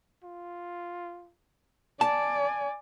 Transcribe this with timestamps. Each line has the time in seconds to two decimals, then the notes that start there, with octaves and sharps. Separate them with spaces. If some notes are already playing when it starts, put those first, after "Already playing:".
0.24 F4
2.01 D5 G#5 A5